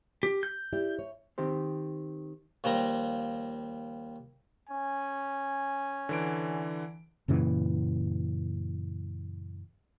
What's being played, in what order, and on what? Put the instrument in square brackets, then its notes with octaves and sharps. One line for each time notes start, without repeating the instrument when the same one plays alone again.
[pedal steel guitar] G4
G6
[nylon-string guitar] E4 G4 D5
C#5
[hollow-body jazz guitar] D#3 C4 G4 C5
[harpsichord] D#2 F3 G3 A#5
[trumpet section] C#4 G#5
[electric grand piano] D3 E3 D7
[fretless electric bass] F#2 A#2 C#3 E3